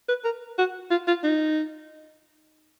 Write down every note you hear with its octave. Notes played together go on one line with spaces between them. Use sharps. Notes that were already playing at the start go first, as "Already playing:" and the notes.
B4
A#4
F#4
F4
F4
D#4